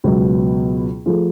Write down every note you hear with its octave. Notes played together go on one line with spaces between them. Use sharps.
C#2 B2 F#3 B3
F3 A3 F4 G#4